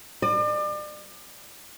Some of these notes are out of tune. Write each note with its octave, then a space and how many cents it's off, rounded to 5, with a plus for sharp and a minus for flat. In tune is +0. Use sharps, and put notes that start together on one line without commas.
D5 +40